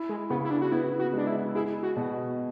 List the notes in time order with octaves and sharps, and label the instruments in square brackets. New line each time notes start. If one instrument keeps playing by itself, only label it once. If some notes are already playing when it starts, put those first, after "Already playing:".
Already playing: [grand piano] E4
[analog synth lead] G#3
[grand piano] C#3 [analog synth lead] B3
[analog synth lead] E4
D4
F#4
[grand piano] B3 [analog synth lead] E4
[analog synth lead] F#4
[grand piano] G#3 [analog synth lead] D4
[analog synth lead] E4
[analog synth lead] E4 [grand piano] G#4
[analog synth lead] F#4
[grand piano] B2